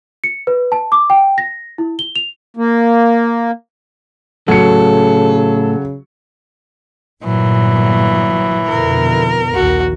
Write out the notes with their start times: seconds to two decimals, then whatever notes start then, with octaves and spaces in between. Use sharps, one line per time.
0.24 C#7
0.47 B4
0.72 A5
0.92 D6
1.10 G5
1.38 A#6
1.78 E4
1.99 G7
2.16 F7
2.57 A#3
4.48 A2 C#3 F#3 A4 C#7
7.25 G1 A#2 E3 F#3
8.69 F2 B2 D3 A#4
9.55 A#1 D#2 F#4